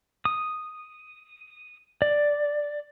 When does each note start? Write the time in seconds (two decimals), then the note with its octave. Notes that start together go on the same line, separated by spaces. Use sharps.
0.25 D#6
2.02 D5